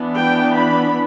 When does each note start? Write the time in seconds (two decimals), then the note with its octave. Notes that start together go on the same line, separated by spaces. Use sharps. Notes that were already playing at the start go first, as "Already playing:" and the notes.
Already playing: E3 B3 D4
0.19 G5
0.57 B5